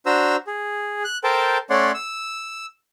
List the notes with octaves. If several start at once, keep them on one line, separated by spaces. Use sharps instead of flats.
D4 F#4 C5 A#5 E6
G#4
F#6
A4 A#4 C5 G5 A5
A3 C#4 C#5 D5 F#5 C6
E6